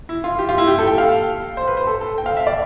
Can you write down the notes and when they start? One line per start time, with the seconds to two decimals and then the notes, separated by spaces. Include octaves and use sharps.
0.09 E4
0.24 F4
0.39 G4
0.49 F4
0.58 E4
0.68 G4
0.79 A4
0.87 G5
0.98 F5
1.57 C5
1.68 B4
1.77 C5
1.87 A4
2.01 A4
2.18 G5
2.26 F5
2.37 E5
2.47 D5